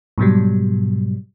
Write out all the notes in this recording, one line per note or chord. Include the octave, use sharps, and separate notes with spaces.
G#2 B2 F#3 G3